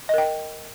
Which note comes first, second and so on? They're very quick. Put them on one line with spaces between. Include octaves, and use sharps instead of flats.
D#5 A#4 G5